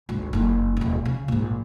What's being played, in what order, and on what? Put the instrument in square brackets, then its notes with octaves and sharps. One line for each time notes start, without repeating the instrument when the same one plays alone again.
[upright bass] G#1 D2
F#1 D#4
D#1 C#4
C#3
A#1 G#2